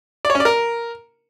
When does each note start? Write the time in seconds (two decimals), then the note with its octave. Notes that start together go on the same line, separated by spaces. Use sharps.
0.25 D5
0.30 C#5
0.35 C#4
0.40 D5
0.45 A#4